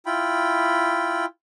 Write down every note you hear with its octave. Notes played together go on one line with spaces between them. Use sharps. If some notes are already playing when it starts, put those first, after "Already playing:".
E4 F4 G5 B5